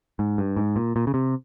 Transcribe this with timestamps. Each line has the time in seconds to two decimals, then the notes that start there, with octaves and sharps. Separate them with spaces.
0.19 G#2
0.38 G2
0.56 G#2
0.76 A#2
0.96 A#2
1.07 C#3
1.14 C3